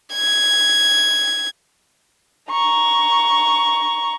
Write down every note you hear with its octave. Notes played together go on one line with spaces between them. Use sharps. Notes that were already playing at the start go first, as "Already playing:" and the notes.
G#6
A#5 C#6